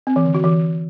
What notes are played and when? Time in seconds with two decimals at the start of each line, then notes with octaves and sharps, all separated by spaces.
0.07 C4
0.16 E3
0.25 D3
0.35 F#4
0.44 E3